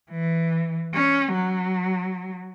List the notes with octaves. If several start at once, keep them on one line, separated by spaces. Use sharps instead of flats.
E3
C#4
F#3